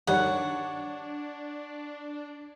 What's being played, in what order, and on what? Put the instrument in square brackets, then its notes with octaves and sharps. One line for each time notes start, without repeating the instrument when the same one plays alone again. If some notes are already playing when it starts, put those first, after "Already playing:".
[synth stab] G2 D#3 G3 [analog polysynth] D4 [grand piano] C#5 [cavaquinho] F#5